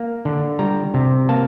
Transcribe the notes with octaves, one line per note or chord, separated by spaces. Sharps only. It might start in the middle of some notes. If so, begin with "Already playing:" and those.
Already playing: A#3
D3
G3 A#5
C3
A#3 A5